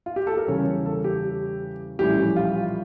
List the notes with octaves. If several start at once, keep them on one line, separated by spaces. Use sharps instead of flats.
F4
G4
A4
A#4
E2 C#3 G3 C#4 C#5
A4
G4
A#1 A2 E3 G3 C#4 G4
F4